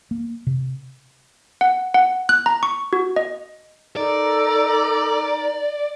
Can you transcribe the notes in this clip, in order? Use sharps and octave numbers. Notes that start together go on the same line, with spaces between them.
A#3
C3
F#5
F#5
F#6
A#5
C#6
F#4
D#5
D#4 A4 A#4 D5 A#5